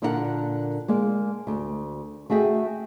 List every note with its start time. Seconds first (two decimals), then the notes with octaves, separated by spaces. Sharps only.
0.02 A#2 D3 D4 E4 A#4 F#5
0.88 G#3 A#3 D5
1.47 D2
2.30 A3 F#4 G#4 E5 G5